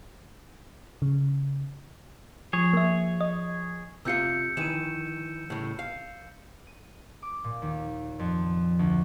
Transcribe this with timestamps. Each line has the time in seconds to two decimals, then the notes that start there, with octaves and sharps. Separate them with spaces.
1.02 C#3
2.53 F3 G#4 C#5
2.73 A#3 E5
3.21 D#5
4.05 C3 F4 F5 E6 G6 C#7
4.57 D#3 E3 D#7 E7
5.50 A2 C#3
5.79 F5
6.67 D#7
7.22 D6
7.44 A#2
7.62 D#2
8.19 F2
8.79 D2